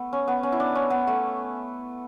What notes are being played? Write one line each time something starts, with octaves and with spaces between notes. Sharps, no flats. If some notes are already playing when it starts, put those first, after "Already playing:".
Already playing: A3 B3
C#4
B3
C#4
E4
D4
C#4
B3
A3